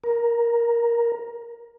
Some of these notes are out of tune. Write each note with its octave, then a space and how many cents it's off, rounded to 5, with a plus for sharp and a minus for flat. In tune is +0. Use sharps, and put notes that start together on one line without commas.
A#4 +10